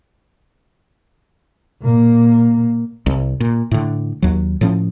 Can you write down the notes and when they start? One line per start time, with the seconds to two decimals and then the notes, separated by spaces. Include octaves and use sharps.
1.82 A#2 A#3
3.06 C2
3.40 A#2
3.71 A2 D3
4.22 D#2 F#3
4.61 A2 F3 C#4